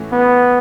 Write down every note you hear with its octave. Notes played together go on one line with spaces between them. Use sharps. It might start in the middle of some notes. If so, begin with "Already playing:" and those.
Already playing: A2 E3 A3 C#4 F#4
B3